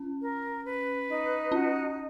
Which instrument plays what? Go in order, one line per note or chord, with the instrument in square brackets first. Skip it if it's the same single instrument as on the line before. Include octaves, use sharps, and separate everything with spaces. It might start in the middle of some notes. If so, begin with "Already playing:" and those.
Already playing: [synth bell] C#4
[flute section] A#4
B4
D#4
[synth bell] C#4 [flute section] F#4